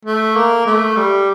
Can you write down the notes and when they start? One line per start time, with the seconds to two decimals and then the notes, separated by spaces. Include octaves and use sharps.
0.05 A3
0.36 A#3
0.66 A3
0.97 G3